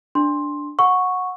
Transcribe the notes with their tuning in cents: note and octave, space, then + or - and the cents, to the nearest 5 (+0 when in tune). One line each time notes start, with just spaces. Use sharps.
D4 +0 C6 +10
F#5 -15 C#6 +0 E6 +0